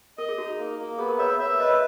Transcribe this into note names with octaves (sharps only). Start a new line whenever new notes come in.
A#4 D#5
G#4
D#4 F#4
A#3
A#3
B3 G#4
A#4
C#5 E5
C#5
C#5 E5
B4
B4 D#5
C#5